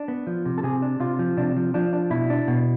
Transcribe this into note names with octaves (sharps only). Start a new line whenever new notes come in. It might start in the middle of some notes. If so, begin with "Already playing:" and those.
Already playing: D4
B3
F3
C3
A4
C3 G#4
D4
C3 F4
F3
C3 D4
F3
F3 D4
D4
B2 E4
D4
B2